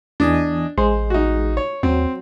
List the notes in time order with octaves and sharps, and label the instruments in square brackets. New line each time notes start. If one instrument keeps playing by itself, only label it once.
[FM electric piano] E2 D#5 G#5 [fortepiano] D4
[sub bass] A1 [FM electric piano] G#3 [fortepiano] C5
[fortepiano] D#4 F#4
C#5
[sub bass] D#2 [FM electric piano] F#3 [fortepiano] C4